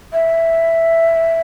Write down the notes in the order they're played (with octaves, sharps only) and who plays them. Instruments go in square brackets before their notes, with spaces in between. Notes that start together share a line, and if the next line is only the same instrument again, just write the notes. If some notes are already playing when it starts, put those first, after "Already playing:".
[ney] E5